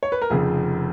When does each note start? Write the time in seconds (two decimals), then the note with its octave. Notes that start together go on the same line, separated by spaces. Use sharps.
0.03 C#5
0.12 B4
0.22 A#4
0.30 F1 F2 C#3 G#4